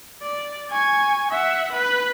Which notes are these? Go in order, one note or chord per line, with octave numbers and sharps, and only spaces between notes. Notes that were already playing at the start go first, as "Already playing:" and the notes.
D5
G#5 C#6
E5 F#5
B4 F#6